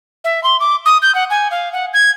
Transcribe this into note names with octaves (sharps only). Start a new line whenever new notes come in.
E5
C6
D6
D#6
G6
F#5
G#5
F5
F#5
G#6